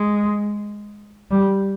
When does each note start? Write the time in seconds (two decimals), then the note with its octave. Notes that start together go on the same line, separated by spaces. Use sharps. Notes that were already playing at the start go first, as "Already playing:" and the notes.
Already playing: G#3
1.31 G3